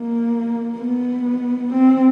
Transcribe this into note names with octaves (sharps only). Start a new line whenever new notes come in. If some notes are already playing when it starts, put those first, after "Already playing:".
Already playing: A#3
B3
C4